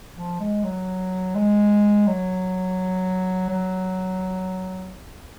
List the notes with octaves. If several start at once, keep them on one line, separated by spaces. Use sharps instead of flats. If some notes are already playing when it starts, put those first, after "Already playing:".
F3
G#3
F#3
G#3
F#3
F#3